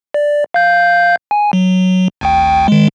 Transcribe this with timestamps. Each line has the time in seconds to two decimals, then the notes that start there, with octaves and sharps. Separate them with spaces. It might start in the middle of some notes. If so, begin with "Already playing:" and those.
0.14 D5
0.54 F5 G6
1.31 G#5
1.53 F#3
2.21 G#1 D2 G5
2.68 D#3 G#3